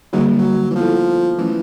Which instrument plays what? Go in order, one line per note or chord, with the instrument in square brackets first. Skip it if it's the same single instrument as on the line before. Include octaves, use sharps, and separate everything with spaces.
[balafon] D3 G3 A#3 D#4 G#4 [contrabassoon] F#3
[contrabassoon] F#3
E3
[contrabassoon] F3 [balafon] B3 E4 A4
[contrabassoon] E3 [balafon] F#3 A3 C#4